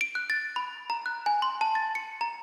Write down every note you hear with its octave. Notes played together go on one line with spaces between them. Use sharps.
D7
F#6
A6
B5
A#5
F#6
G#5
C6
A5
A6
C#7
A#5